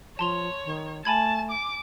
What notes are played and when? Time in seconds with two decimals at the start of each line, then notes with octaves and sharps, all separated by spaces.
0.19 F3 C#5 A5 C6 F7
0.65 D#3
1.05 A3 G#5 A5 B5 G#6
1.51 D6